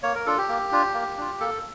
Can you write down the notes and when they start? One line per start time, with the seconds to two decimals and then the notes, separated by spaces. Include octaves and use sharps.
0.03 A#3 C#5
0.15 A#4
0.26 D4 F4 A4
0.38 G4
0.48 A#3
0.72 D4 F4
0.94 A#3
1.17 D4 F4
1.40 A#3 A4